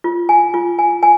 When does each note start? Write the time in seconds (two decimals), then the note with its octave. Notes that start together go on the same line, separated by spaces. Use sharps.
0.04 F4
0.29 G#5
0.54 F4
0.79 G#5
1.03 G#5